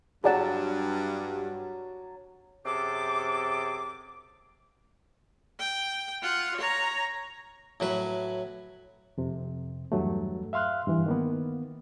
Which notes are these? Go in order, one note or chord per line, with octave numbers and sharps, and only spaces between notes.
G2 F#3 G#4 D5 F#5 A5 E6
F#2 C3 G#4 A4 D6
G5
F4 F#5
C#5 A#5
A2 F#3 B4
F2 C3
E2 G2 F#3 A3
E5 F5 C6 F6 F#6
G2 E3
D#3 A#3 B3